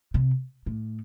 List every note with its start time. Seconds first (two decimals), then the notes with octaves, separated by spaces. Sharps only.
0.14 C3
0.66 A2